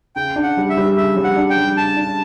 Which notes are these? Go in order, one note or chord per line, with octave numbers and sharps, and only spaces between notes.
C#3 G5
D4
F#5
G3
E5
G3
C#3 E5
G3
F#5
D4
G5
G3
C#3 A5
D4